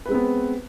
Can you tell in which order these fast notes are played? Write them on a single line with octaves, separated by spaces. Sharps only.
B4 G#3 C4 B3